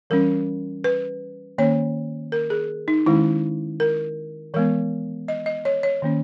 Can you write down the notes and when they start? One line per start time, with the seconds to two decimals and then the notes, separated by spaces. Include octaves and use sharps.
0.10 E3 G3 C#4 A#4
0.84 B4
1.58 D#3 A#3 C#4 C#5
2.32 A#4
2.50 G#4
2.88 D#4
3.06 D#3 G#3 C#4 E4
3.80 A#4
4.54 E3 G#3 B3 A#4
5.28 D#5
5.46 D#5
5.65 C#5
5.83 C#5
6.02 D#3 A#3 C#4